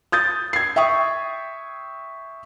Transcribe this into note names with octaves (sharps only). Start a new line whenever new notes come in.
D#6 G6 A6
G#6 C7
E5 G5 C#6 D#6